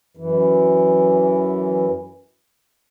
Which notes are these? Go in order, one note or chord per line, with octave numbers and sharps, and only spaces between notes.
F#2 E3